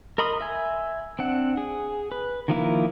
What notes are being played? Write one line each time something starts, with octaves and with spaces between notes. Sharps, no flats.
A#4 D#5 B5 C6 D#6
E5 G#5
C4 D4 F#5
G#4
B4
D#3 F3 A#3 E4